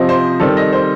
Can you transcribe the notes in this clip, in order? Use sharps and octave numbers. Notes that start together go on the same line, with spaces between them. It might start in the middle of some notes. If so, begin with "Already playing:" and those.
Already playing: C3 F3 C4 D#5
C5
D#3 G3 C4 A4
D#5
C5